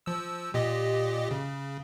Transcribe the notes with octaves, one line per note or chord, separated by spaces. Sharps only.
F3 E6
A#2 G4 D#5
C#3